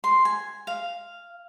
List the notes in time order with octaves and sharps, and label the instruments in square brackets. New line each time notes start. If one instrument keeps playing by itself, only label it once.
[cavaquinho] C6
G#5
F5